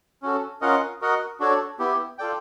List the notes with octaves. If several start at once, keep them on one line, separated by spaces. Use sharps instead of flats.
C#4 F#4 A4
C#4 F4 A#4 D#5 F#5
F#4 A#4 D#5 F#5
D4 F#4 A4 C#5
B3 E4 G4
F4 A4 D5 G5